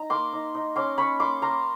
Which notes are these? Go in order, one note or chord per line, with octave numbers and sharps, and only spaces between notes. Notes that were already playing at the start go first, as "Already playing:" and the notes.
Already playing: D#4 A#5
A#3 C6 D6
D#4
D#4
C#4 C6 D6
C#4 B5 C#6
A#3 C6 D6
A#3 A#5 C6